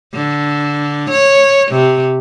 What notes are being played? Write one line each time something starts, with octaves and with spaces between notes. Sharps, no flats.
D3
C#5
C3